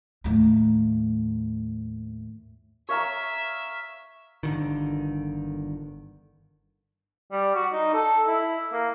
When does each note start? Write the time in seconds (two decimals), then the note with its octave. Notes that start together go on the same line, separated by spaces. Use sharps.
0.24 D#2 A2
2.89 C#5 E5 F5 A#5
4.43 G1 D3 D#3
7.31 G3
7.55 F#4
7.72 D#4
7.93 A4
8.28 E4
8.73 A#3